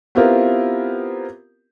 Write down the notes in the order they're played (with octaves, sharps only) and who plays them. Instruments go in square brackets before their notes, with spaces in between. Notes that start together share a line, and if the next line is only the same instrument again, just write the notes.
[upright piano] B3 C4 E4 F4 G4 A#4